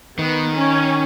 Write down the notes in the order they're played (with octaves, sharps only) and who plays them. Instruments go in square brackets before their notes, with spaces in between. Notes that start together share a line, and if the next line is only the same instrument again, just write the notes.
[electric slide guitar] D#3 [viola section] B3
[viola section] C#4